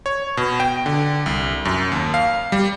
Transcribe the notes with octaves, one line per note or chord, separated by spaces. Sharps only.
C#5
B2
G5
D3
C2
F#2
D#2
F5
G3